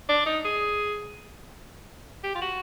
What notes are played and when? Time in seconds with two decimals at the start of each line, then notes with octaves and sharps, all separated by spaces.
0.09 D4
0.26 D#4
0.45 G#4
2.23 G4
2.35 F4
2.41 F#4